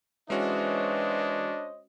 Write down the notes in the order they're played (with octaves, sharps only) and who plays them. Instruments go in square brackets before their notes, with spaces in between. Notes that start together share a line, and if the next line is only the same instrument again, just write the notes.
[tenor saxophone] E3 [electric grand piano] G#3 C#4 F#4 [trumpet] D4 [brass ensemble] C5 C#5 D#5